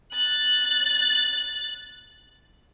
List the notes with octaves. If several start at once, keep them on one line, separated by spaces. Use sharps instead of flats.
F#6 A6